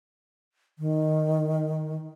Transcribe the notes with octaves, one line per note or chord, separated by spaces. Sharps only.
D#3